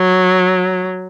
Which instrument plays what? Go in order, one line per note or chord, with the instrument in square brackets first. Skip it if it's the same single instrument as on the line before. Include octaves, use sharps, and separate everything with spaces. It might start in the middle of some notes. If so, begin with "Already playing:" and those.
Already playing: [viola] F#3